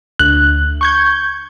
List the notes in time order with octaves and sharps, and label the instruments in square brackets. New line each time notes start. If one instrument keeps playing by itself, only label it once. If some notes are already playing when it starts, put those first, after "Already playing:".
[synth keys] D2 [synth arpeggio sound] F#6
[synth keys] C#6 G6 G#6